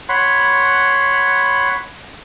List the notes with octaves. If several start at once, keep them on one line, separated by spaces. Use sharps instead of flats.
C#5 F#5 B5 C6